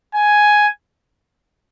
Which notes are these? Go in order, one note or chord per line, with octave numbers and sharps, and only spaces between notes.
G#5